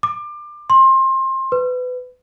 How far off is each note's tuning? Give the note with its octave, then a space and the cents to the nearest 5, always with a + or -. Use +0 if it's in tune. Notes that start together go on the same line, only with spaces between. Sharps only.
D6 +25
C6 +25
B4 +25